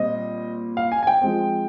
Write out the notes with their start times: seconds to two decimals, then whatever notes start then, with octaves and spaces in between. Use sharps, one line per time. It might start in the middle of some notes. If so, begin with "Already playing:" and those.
Already playing: A#2 G3 C4 D#5
0.77 F5
0.92 G#5
1.03 G#5
1.07 G5
1.21 F3 G#3 C4